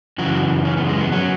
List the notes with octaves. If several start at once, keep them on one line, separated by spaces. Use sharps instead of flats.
F#2 C#3 E3 F#4
C#4
B3
G#3
B3
F#3 C#4